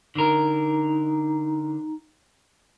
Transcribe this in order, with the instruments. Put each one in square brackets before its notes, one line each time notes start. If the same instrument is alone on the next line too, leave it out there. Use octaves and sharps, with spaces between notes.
[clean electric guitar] D3 A#4 [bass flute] D#4